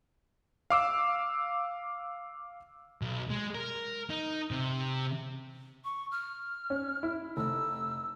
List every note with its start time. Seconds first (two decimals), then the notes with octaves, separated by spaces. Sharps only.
0.70 F5 D6 E6
3.02 B1
3.30 G#3
3.55 A#4
4.10 D#4
4.51 C3
5.84 C#6
6.12 F6
6.70 C#4
7.03 E4
7.37 F1 E6